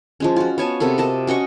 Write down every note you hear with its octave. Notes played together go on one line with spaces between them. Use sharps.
F3 G#3 C#4
F4 F#4
B3 C#5 G#5 A5
C3 B3 A4 A#4
A#4 D#5 A5
C#4 F#4 D#5 C#6